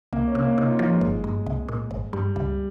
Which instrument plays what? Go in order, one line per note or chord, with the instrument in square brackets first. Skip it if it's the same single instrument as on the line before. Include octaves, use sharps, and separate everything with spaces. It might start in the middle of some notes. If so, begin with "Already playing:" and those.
[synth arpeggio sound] C2 [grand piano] A#3
[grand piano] C#4
[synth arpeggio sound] C3
[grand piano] A#3
[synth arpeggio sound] C3 [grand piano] D#4
[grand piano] F4
[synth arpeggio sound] F3 [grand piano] F4
[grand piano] G#3
[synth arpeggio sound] G1
G2
C2
A#2
G#1
[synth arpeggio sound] G2 [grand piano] G3
[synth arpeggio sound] C#2 [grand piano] G3